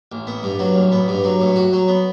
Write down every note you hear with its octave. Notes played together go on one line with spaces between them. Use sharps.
A1
B3
G2
F#3
A1
B3
G2
F#3
A2
F#4
F#3
B3